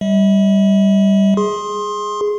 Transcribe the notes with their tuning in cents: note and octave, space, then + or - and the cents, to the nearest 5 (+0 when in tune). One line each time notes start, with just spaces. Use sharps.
G3 +0 E5 -45
G#4 +0 C6 +20